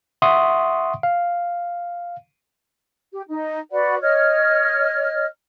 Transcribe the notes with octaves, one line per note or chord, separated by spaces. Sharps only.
E5 F#5 C6 C#6 D#6
F5
G4
D#4
F#4 B4 D5 F#5
C#5 D#5 F6